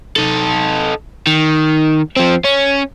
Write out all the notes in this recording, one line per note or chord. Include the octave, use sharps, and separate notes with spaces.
D#4 A4
D#3
F3 C4
C#4